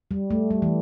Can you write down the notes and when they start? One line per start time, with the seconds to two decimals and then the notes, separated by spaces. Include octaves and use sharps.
0.11 G3
0.31 A3
0.51 G3
0.62 E3